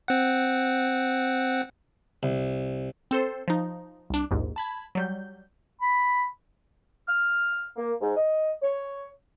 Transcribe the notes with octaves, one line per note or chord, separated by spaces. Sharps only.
C4 F#5
C2
C4 A4 C5
F3 D#4
C2 D4
A#1 D#2 G#2
A5 B5 G#6
F#3 G3 G6
B5
F6
A#3
G#2
D#5
C#5